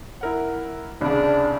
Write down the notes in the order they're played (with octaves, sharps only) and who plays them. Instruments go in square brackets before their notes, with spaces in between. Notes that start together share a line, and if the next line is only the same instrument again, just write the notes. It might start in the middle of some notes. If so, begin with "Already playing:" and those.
[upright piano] E4 A#4 F#5
[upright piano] C2 C#3 [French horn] D4